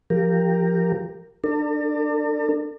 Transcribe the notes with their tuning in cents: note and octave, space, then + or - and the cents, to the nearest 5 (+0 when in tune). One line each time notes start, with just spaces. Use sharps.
F3 +0 G4 +10 A#4 -10
D4 +20 A4 +45